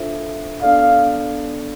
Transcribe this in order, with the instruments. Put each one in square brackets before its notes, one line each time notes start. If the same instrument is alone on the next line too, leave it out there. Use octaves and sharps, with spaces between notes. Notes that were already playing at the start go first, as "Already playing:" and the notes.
Already playing: [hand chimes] D4 F4 A4 C5 E5
[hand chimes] B3 D4 A4 D5 [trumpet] F5